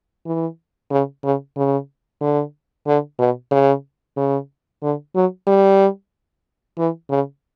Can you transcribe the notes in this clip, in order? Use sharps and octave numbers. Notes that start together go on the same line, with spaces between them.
E3
C#3
C#3
C#3
D3
D3
B2
C#3
C#3
D3
F#3
G3
E3
C#3